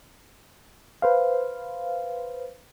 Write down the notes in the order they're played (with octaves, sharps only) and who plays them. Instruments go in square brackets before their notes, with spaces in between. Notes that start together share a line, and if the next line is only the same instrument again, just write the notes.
[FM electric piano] B4 C5 F5